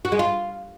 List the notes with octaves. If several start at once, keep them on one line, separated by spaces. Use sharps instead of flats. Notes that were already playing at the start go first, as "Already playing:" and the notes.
F#4
G#3
F4